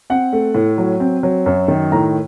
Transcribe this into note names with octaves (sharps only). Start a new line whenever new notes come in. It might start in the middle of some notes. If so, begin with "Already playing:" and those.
C4 F#5
A3
A2
F#3
C4
F#3
F#2
D#3
A2 A#5